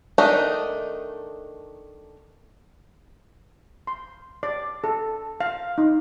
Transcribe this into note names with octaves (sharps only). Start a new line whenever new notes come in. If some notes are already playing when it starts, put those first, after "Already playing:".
D#3 A3 D4 D#4
C6
D5
A4
F5
D#4